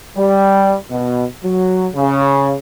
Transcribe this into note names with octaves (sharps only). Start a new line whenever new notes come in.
G3
B2
F#3
C#3